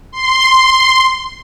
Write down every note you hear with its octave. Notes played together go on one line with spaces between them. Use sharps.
C6